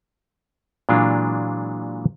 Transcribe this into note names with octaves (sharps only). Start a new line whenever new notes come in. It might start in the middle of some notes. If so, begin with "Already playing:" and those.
A#2 E3 F#3 G#3 D4 F4